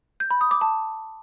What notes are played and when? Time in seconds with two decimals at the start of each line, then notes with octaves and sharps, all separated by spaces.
0.20 G6
0.31 B5
0.41 D#6
0.51 D6
0.61 A5